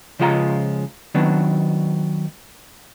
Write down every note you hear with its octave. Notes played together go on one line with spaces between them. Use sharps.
C#3 F3 G#3 F4 F#5 A#5
D#3 F#3 B3 D4